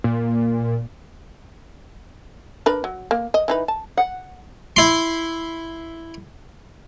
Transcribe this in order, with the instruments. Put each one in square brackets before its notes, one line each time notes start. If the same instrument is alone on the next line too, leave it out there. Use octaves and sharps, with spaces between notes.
[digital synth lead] A#2
[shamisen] D4 A#4 B4
F#3
A#3
D#5
E3 D#4 B4
A5
[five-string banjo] F#5
[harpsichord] E4 C6